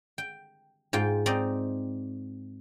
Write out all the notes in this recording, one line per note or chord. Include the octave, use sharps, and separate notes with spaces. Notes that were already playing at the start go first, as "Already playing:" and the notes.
G5
G#2 F4 G5
C4 D#4 D5 D#5